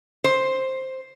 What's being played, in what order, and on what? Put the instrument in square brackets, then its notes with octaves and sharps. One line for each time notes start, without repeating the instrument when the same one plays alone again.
[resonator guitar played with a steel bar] C5